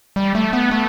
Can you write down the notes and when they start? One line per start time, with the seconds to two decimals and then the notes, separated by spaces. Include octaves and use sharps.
0.16 G3
0.35 A3
0.53 B3
0.71 A3